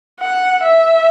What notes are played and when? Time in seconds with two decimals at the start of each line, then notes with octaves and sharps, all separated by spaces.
0.20 F#5
0.63 E5